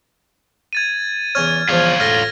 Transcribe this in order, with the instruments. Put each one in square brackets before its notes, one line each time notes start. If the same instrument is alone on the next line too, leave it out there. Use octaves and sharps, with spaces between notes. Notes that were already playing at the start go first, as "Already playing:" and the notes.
[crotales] G#6 A6 D#7
[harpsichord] E2 C#4 C#5 [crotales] F6 G#6
[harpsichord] E2 F3 [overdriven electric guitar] F4 C#5
[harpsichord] A2 [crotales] F6 A#6